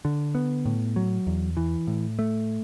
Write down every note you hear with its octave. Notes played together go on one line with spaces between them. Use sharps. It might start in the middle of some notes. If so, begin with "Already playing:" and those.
D3
B3
A2
F#3
E2
E3
A2
A3